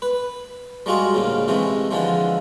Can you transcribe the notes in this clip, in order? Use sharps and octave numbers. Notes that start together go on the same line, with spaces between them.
B4
G3 G#3 F4 F#4 G#4
D2 A#2 C#3
C3 E3 G#3 A3
D3 E3 F3 G#3